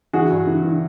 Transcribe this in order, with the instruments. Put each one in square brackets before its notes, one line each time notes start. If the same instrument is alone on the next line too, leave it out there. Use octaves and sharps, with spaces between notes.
[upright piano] E3 F#4 G#4
G2
E3
E3